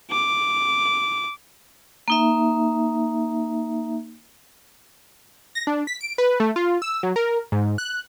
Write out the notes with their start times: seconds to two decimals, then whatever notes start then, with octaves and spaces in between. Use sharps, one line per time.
0.11 D6
2.08 A#3 D#4 E5
5.55 A#6
5.67 D4
5.87 B6
6.01 D7
6.18 B4
6.40 A3
6.56 F4
6.82 E6
7.03 F#3
7.16 A#4
7.52 G#2
7.78 F#6